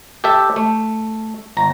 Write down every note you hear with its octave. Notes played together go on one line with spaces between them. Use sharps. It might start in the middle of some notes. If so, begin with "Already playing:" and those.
G4 A4 E5
A3
G1 A#5